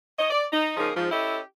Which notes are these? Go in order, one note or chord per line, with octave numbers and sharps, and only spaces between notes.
C#5 D#5
D5
D#4
C#3 F3 A#3 D#4 G#4
G#2 F3
C#4 E4 G4 A4 D#5